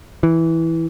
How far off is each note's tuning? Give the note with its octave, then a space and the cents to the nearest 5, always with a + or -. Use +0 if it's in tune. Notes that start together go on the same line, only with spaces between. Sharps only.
E3 -5